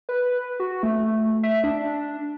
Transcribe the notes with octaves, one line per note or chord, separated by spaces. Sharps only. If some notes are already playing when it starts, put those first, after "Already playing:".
B4
F#4
A3
E5
D4